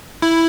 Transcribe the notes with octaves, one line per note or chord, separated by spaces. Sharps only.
E4